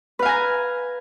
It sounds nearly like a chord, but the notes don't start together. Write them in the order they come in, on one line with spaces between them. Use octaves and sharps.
B4 F5 G#5 A#5